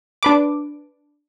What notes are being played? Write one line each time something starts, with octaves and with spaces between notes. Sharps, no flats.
D4 B4 D6